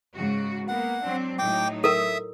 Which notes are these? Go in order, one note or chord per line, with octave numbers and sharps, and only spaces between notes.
G#2 C#3 F#4
A#3 B3 F#5
F#3 C4 D4
A2 F#3 D#4 G5 D6
A4 A#4 E5 D#6